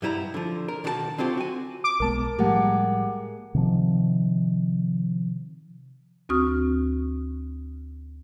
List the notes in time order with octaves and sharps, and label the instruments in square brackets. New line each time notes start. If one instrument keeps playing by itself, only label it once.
[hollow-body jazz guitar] G2 F#3 G3 E4 D5 A#5
D3 F3
A#4
B1 D#3 D4 F#4 G#4 A5
D3 F#3 C4 F4 G4
F#4 G#5
[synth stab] D6
[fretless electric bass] B1 G#3 B3 [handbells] A#4 A5
[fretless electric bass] A2 F3 G3 [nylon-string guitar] G#3 A#3 [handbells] G4 F#5
[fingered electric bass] C3 D#3 F3
[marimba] D2 C4 F#4 C#6 D#6 F6